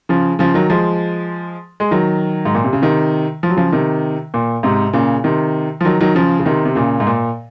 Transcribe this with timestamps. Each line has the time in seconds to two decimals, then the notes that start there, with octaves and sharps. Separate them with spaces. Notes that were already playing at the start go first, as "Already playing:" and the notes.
0.09 C#3 F3
0.39 C#3 F3
0.54 D#3 F#3
0.70 F3 G#3
1.80 G#3
1.91 D#3 F#3
2.45 G#2
2.55 A#2
2.64 C3
2.73 C#3
2.82 C3 D#3
3.43 F3
3.50 F#3
3.56 C#3 F3
3.72 C3 D#3
4.34 A#2
4.63 G#2 C3
4.93 A#2 C#3
5.24 C3 D#3
5.81 F3
5.85 D#3 F#3
6.00 D#3 F#3
6.15 C#3 F3
6.40 C#3
6.46 C3 D#3
6.65 C3
6.75 A#2 C#3
7.00 G#2
7.07 A#2